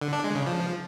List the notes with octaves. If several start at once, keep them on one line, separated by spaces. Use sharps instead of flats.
D3
D4
G#3
C#3
F3